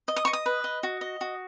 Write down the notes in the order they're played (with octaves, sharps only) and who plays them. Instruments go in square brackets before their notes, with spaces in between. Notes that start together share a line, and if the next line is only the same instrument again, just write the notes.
[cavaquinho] D#5
D#6
D#5 C#6
D#6
B4
D#5
F#4
D#5
F#4